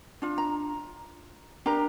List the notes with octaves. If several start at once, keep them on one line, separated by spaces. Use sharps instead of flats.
D4 F4
A#5
D4 G4 A#4 A#5